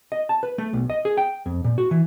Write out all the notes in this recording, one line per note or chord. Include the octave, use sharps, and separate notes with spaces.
D#5
A5
B4
A3
B1
D#5
G#4
G5
F2
A#2
F#4
E3